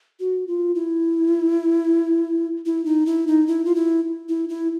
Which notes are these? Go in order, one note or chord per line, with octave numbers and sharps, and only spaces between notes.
F#4
F4
E4
E4
D#4
E4
D#4
E4
F4
E4
E4
E4